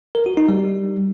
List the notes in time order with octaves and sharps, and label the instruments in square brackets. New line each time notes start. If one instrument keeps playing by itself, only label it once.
[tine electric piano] A#4
F#4
D#4
G3